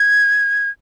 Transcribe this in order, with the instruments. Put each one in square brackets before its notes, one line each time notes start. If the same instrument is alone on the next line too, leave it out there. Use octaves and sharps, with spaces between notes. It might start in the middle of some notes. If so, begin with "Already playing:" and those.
Already playing: [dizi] G#6